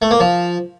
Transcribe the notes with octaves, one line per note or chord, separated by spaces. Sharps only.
A3
A#3
F3